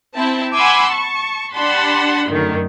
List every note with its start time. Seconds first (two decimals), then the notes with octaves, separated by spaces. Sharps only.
0.16 C4 E4 A5
0.56 F#5 G#5 B5 C6 D6 E6
0.91 A5 C#6
1.53 D4 G4 F#5 A5 B5 C6
2.30 F#2 D3 D#3 A3